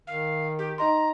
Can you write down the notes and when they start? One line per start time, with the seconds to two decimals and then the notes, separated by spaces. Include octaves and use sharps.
0.07 D#3 F5
0.59 G4
0.78 D#4 D#5 A#5 C6